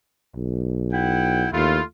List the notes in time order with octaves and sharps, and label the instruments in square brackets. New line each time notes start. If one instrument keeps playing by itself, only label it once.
[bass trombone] B1
[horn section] E4 F#5 G5
[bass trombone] D#2 [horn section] A3 E4 F4